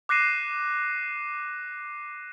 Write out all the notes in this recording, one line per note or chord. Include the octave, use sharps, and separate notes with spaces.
D6 F#6 A#6 C7 D#7 E7